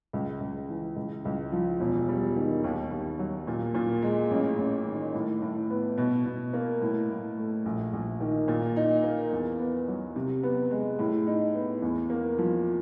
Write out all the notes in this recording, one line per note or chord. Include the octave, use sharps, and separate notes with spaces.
C#2
C#2
E3
C#2
C#2
F3
E1
G3
D#3
D#2
D#2
F#3
A#2
A#2
G#3
A1
A1
D#3
A2
A2
B3
B2
B2
A#3
A2
A2
A3
A#1
A#1
D#3
A#2
D#4
A#3
E2
B3
F#3
C3
B3
G#3
A2
D#4
B3
E2
A#3
F3